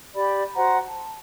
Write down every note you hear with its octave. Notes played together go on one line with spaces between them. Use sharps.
G4 D5 B5
F#4 C5 F#5 A#5
A5